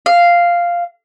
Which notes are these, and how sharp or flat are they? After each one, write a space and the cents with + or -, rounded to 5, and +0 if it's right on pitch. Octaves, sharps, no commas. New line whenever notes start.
F5 -5